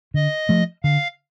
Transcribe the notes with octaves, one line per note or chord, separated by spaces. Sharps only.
D3 D#5
F3 A3
D3 F5